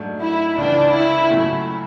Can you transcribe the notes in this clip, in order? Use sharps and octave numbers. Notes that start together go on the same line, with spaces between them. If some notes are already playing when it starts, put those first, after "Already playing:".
Already playing: G#2 F#3 A3 D4
E4
C#2 C#3 E3 D4
E4
C#3 F#3 A3 C#4